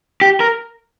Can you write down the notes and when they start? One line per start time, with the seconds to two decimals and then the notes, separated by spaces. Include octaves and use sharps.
0.21 G4
0.40 A#4